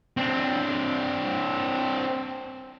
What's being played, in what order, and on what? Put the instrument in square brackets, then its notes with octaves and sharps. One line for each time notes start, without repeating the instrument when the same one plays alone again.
[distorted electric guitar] C4 D4